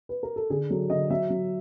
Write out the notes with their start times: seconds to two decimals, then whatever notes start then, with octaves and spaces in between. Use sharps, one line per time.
0.09 B4
0.23 A#4
0.36 A4
0.50 D3 G#4
0.70 F#3 A4
0.90 D3 D#5
1.10 F#3 E5
1.30 F#3